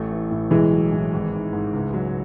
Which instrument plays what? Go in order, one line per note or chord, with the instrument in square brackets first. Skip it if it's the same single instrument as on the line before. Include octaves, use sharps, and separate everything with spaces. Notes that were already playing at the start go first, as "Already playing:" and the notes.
Already playing: [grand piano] A1 [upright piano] A3
[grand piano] E3
A2
[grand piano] B1 [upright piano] E3 G#3
[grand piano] F#3
A2
G#1
D#3
G#2
C#2
F#3